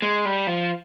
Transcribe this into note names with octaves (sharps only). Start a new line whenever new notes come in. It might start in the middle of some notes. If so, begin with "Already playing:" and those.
G#3
G3
F3